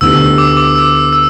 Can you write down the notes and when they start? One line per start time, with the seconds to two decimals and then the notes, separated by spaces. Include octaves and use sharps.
0.01 D2 D3 B3 E4 G4 E6
0.38 D6
0.57 D6
0.75 E6
1.13 E6